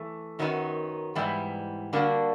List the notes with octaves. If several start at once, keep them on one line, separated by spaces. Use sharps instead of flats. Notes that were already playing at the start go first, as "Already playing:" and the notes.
Already playing: E3 A3
F#2 D#3 F#3 B3 D#4
G#2 E3 G3 B3 E4
D3 G3 A#3 D4 F#4